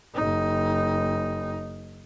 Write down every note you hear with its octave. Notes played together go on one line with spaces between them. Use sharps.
F#1 D#4